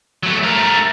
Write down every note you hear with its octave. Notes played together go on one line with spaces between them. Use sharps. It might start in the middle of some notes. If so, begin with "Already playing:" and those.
F#3 A3
A3 A#4